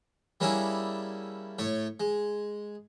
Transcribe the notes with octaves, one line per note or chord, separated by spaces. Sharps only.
G3 A#3 C#4 D4 E4 G#4
A2 A3 C#5
G#3